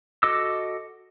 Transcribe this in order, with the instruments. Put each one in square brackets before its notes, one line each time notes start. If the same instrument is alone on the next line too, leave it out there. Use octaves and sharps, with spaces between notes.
[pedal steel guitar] F#4 A4 D#5 D6 E6